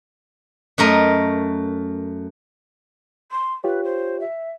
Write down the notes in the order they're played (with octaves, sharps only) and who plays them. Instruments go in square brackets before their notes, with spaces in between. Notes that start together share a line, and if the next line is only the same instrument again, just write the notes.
[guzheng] F#2 A3 A#4 D#5
[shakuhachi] C6
[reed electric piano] F4 G4 C#5 [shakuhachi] B4
[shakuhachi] C5
E5